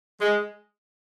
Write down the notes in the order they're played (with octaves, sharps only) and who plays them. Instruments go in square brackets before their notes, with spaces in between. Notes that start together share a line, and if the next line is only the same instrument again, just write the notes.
[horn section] G#3